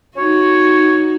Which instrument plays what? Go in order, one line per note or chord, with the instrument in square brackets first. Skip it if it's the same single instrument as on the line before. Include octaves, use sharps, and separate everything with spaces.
[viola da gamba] D#4 F#4 [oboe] C#5